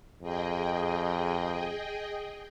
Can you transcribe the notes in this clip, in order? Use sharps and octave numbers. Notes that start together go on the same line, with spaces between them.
F2 G#4 D#5 G5